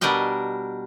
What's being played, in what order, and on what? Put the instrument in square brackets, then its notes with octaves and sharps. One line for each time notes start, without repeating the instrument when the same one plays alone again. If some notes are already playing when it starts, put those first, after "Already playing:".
[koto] B2 G3 D4 A#4 D#5 G5